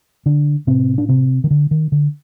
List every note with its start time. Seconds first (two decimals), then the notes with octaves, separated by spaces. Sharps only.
0.26 D3 D4
0.67 A2 C3 C4
0.98 D4
1.09 C3 C4
1.44 D#3
1.50 D3
1.71 D#3
1.92 D3